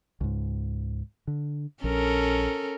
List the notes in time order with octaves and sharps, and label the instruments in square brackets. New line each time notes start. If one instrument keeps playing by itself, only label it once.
[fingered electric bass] C#2 G#2
D3
[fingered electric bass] A#1 [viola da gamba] C#4 A4 A#4